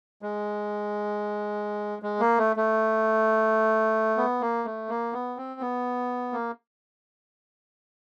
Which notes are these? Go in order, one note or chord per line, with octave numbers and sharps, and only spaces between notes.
G#3
G#3
A#3
A3
A3
B3
A#3
A3
A#3
B3
C4
B3
A#3